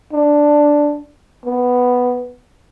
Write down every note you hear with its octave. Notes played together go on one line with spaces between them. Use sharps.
D4
B3